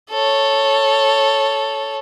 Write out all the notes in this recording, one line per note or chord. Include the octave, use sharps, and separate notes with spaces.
A4 C#5